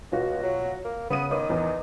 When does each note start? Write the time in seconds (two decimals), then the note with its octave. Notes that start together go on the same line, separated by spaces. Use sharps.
0.12 C#2 B2 F4 F#4
0.43 F#3
0.85 A#3
1.10 C#3 B3 D#6 D#7
1.30 D#3 B3 C#5 D6
1.50 E2